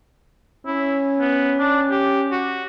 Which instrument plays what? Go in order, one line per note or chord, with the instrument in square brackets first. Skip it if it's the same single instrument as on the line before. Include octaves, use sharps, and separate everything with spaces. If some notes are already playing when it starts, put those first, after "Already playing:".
[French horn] C#4 [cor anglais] E4
[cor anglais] B3
D4
G4
F#4